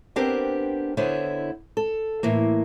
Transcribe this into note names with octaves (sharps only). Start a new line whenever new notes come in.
B3 C4 D4 G4 A#4 C5
D3 B3 E4 C5 C#5
A4
A2 E3 A#3